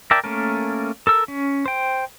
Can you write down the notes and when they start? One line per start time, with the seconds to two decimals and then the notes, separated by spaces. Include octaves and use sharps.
0.11 A#4 D5 E5 G5 A5
0.24 A3 A#3 C#4 A4 A#4
1.07 A4 A#4 E6
1.28 C#4
1.66 C5 G5